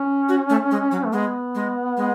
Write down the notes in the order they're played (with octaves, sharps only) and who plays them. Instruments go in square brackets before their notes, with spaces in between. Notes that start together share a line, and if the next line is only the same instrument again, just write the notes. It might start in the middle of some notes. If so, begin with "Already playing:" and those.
Already playing: [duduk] C#4
[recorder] F#4
A3
G#3
F#3
[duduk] A3
[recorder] G#3 [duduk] B3
[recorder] G#3
G#3